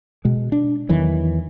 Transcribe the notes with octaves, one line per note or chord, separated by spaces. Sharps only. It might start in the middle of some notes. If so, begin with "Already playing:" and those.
B2 G#3
D4
E2 D#3 E3 F#3